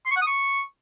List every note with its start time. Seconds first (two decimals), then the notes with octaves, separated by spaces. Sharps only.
0.05 C6
0.11 C#6
0.16 F#5
0.21 D#6
0.27 C#6